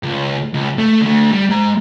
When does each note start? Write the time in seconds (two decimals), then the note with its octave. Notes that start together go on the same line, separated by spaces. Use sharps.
0.03 C#2
0.53 C#2
0.78 A3
1.02 D3 A3
1.32 G3
1.50 G#3 A#5